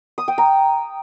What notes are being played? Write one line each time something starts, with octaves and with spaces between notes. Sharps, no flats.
D#6
G5
A#5